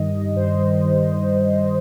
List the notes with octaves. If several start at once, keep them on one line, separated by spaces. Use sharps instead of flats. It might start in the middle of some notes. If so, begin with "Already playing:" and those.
Already playing: G2 D#3 G3 D#5
G2
G2 C5
G3
D#3
G2